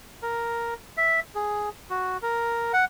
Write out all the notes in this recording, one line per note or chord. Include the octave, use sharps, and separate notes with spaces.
A#4
E5
G#4
F#4
A#4
F#5